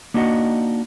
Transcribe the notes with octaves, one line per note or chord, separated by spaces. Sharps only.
A#3 D4 D#4 F#4 D#5 F#5